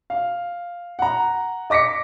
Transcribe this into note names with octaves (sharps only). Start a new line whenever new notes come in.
F5
F#5 A#5
D#5 D6 A#6 B6 C#7